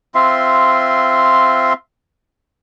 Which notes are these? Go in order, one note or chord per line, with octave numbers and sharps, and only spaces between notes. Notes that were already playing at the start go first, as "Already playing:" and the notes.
C4 F4 E5 C6